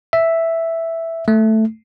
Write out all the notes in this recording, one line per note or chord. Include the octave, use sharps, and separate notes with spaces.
E5
A3